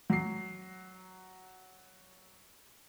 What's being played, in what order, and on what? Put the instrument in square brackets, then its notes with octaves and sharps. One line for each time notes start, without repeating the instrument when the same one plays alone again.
[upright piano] F#3 C7